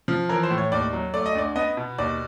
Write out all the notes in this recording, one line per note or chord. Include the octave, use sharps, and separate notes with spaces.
F3
E3 A#4
C5
A2
C#5
D#2 D5
F#3
A3 D5
D#5
D2 D5
B3 D#5
B2
D#2 D5